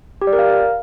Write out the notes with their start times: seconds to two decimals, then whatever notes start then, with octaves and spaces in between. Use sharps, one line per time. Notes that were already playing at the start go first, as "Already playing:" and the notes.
0.22 G4
0.27 D5
0.33 A#4
0.39 F5